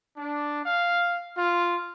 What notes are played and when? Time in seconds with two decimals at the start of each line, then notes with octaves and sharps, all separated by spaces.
0.17 D4
0.64 F5
1.36 F4